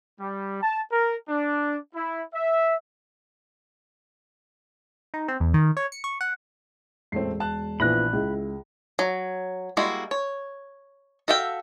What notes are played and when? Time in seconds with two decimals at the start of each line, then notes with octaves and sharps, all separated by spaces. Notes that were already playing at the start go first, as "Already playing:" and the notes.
0.20 G3
0.63 A5
0.92 A#4
1.29 D4
1.95 E4
2.34 E5
5.14 D#4
5.28 C4
5.40 E2
5.54 D#3
5.77 C#5
5.92 C#7
6.04 C#6
6.21 F#5
7.12 E1 A2 A3 C4 C7
7.40 A5 F#6
7.80 A#1 E3 F3 B3 D4 B5 F#6 A#6
8.13 C#2 E4
8.99 F#3
9.77 G3 G#3 A#3 E4 F#4
10.11 C#5
11.28 F#4 A4 E5 F5 G5